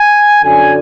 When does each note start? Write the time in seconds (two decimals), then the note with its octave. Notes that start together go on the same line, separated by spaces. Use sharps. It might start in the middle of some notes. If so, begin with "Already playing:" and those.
Already playing: G#5
0.43 F#2 D3 F#3 G#5